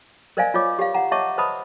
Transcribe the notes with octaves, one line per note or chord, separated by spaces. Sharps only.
A#4 C5 D5 D#5 F5 G#5
F4 C#5 D#5 D6
G4 F5
F#5 A#5
C#5 D#5 E5 A5 C#6 D6
B4 C5 D#5 A5 B5 D#6